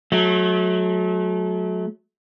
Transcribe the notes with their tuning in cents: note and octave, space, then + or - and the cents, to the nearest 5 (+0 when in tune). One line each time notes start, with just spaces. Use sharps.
F#3 -15 A3 -35